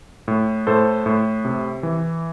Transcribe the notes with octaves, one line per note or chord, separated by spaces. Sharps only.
A2
A2 A4 C5
A2
C3
E3